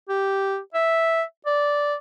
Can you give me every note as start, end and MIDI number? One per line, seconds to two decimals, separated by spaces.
0.09 0.58 67
0.74 1.22 76
1.46 1.95 74